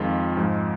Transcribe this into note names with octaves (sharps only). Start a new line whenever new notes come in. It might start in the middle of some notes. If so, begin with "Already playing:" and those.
Already playing: F2 D#3 G#3 F4
G#2 F3 G#3